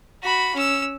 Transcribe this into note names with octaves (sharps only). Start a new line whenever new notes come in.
F#4 B5
C#4 E6